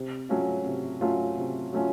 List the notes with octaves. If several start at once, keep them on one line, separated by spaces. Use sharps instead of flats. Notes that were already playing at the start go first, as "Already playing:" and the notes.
Already playing: C3
F#3 A3 C#4 F4
C3
F#3 A3 C#4 F4
C3
F#3 A3 C#4 F4